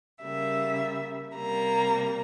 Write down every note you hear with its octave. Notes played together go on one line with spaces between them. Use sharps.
C#3 G3 A#3 E5
C3 G3 A#3 A#5